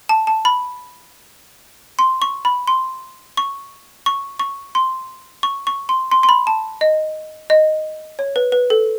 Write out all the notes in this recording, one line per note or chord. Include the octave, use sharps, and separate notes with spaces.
A5
A5
B5
C6
C#6
B5
C6
C#6
C#6
C#6
C6
C#6
C#6
C6
C6
C6
B5
A5
D#5
D#5
C#5
B4
B4
A4